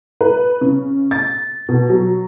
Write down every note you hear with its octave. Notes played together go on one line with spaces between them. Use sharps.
B4
C#3
A6
B2
F#3